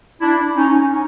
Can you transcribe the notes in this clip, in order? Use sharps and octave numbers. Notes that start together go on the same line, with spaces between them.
D4 E4
C#4 D#4
C#4 D#4